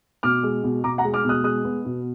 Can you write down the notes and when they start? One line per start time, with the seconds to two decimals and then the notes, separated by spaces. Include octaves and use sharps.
0.23 B2 D6 F6
0.43 G#3
0.64 B2
0.84 B2 A#5 D6
0.98 F#5 A#5
1.04 G#3
1.14 D6 F6
1.24 B2 D#6 F#6
1.44 G#3 D#6 F#6
1.65 B3
1.85 B2